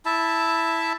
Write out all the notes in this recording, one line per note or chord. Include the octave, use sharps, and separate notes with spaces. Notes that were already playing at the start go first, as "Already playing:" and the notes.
E4 E5 A5